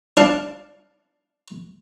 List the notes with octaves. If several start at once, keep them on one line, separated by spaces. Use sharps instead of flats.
D4 F5 A5